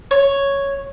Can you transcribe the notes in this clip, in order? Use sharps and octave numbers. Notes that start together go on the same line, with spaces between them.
C#5